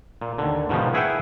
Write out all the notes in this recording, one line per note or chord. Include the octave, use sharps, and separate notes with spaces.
A#2
D#2 D3
G#2 B2 D#3 F3
E4 G#4 B4 E5 F#5 G5